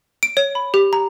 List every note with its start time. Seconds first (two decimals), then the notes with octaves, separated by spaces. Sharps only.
0.23 D7
0.37 C#5
0.55 B5
0.74 G4
0.93 A#5